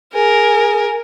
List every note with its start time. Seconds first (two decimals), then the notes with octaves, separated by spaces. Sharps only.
0.14 G#4 A#4 G#5